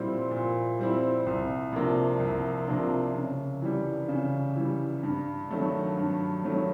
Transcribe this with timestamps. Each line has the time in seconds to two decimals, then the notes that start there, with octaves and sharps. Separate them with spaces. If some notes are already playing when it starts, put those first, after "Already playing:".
Already playing: A#2 G3 C4 E4
0.31 A#2
0.79 G3 C4 E4
1.26 C2
1.73 C3 F3 A#3 D4
2.20 C2
2.67 C3 F3 A#3 D4
3.14 C#3
3.62 E3 G3
4.08 C#3
4.56 E3 G3
5.03 G2
5.51 D#3 F#3 A3
5.97 G2
6.44 D#3 F#3 A3